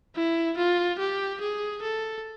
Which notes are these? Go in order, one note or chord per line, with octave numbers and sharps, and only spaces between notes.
E4
F4
G4
G#4
A4